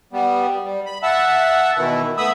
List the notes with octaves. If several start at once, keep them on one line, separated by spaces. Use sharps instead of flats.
G3 B3
G3
B5
E5 F#5 A5 E6
B2 D#3 E3 E4
A3 B3 E5 B5 D#6 E6